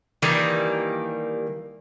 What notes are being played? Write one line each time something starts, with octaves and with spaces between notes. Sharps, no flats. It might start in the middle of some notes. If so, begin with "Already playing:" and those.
D#3 E3 G3 A#3